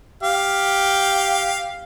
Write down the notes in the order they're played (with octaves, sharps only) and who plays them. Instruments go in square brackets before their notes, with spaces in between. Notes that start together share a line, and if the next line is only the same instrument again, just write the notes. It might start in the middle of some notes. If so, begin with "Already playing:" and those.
[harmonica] G4 F5